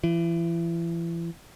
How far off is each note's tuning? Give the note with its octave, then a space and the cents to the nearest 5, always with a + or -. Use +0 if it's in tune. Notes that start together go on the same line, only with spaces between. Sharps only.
E3 +35